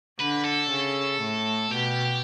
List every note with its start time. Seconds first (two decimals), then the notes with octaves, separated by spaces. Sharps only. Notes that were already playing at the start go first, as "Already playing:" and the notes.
0.20 D3 B4
0.45 A4
0.70 C#3
1.21 A2
1.71 B2 G4